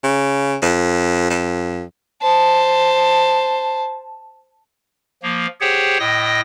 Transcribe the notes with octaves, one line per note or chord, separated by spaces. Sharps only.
C#3
F2
F2
C5 A5
F3 A#3
G4 G#4 C5 C#5 F#5 G5
A2 D#5 G5 D#6 A#6